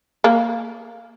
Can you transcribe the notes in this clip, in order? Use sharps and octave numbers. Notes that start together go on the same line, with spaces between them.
A#3